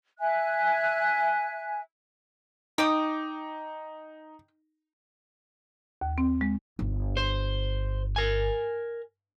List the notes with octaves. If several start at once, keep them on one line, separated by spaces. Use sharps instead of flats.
E5 G#5 F#6
D#4 G5 D6 D#6
D#2
C4
G#3
G1
C5
A#4 G#5